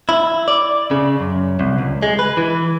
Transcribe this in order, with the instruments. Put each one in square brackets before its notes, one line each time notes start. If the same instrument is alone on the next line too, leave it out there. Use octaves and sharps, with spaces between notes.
[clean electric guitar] E4
D5
C#3
F#2
C2
C#2
G#3
B4
E3